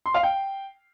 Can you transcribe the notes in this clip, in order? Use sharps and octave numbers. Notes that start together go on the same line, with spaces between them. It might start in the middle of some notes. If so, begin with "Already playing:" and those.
C6
F5
G5